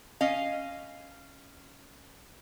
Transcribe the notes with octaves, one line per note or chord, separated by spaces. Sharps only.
C#4 D#5 F5